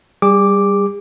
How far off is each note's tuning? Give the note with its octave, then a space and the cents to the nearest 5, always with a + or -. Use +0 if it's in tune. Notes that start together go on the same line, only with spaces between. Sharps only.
G3 +0 G#4 -45 D6 +0